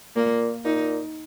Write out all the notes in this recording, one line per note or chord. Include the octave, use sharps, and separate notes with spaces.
A#2 A#3
A#2 D#4